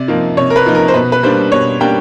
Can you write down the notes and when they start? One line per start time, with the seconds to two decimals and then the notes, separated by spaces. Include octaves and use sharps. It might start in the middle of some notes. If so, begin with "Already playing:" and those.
Already playing: C3 D5
0.08 F3 A#3 D#4
0.37 C3 C#5
0.50 A#4
0.56 B4
0.66 F3 A#3 D#4
0.75 A#4
0.88 C5
0.94 B2 B4
1.12 B4
1.23 G3 A#3 D4 C5
1.52 B2 C#5
1.80 G3 A#3 D4 G5